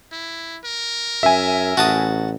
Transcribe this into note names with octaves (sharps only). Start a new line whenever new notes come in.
E4
A#4
F#2 E5 G#5
A1 F#4 A5 D#6